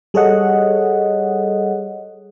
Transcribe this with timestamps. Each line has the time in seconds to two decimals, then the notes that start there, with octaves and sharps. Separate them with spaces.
0.14 G3 G#4 A4 C#5 D#5 F#5